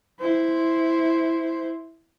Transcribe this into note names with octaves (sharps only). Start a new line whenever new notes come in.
E4 C5